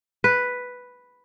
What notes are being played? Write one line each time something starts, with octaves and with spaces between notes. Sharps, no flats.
B4